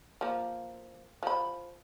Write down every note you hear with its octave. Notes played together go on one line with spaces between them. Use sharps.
F3 A#3
F3 B5